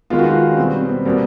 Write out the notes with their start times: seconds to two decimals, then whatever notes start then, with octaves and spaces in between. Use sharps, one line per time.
0.10 D#3 G#3 B3 F4
0.19 F#4
0.26 F4
0.51 C#4
0.57 B2 G3 B3 C4
0.74 C4
0.89 B3
1.05 B2 G3 A#3 C4